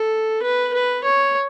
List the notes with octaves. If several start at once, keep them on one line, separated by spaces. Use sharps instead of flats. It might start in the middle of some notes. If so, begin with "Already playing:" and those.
Already playing: A4
B4
B4
C#5